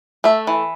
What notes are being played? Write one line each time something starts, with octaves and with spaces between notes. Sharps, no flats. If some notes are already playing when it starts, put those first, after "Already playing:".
A3 E5
E3